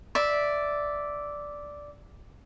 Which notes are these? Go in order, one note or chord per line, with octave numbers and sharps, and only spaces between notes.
D5 E5